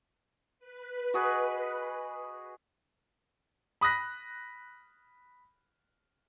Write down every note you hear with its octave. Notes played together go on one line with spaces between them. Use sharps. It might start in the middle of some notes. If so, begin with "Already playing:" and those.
B4
F#4 G#4 D#5
B5 D#6 F#6 A#6 B6